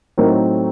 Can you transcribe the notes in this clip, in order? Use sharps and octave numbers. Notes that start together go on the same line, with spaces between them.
A2 F#3 A3 C4 D#4 A#4